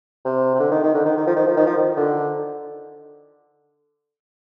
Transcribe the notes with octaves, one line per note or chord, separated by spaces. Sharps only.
C3
C3
D3
D#3
D#3
D3
D#3
D#3
F3
D#3
F3
D#3
F3
D#3
D3